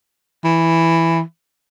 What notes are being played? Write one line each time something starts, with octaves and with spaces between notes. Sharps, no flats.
E3